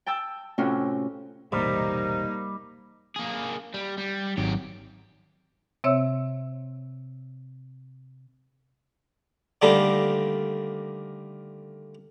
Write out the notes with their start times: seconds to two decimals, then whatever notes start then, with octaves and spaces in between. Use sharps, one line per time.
0.06 G5 A5 E6
0.58 A2 C3 C4 C#4 F4 F#4
1.52 E1 A1 A2 C3 G3 A#3 D#4
3.16 A#3 G#4
3.74 G3
3.98 G3
4.38 G#1 F#2 G4
5.84 C3 C4 C#5 E5 E6
9.62 D3 D#3 G3 A3 A#3 D4